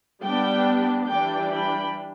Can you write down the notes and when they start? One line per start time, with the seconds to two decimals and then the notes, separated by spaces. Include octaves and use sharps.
0.22 G3 B3 D4 D5 G5
1.08 E3 G3 D4 D5 G5
1.50 G5 B5